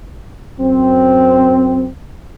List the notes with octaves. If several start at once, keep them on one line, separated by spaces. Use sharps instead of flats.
F#2 C4